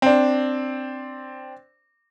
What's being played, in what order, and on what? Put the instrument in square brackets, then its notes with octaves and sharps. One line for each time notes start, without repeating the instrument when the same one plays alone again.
[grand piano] C4 D4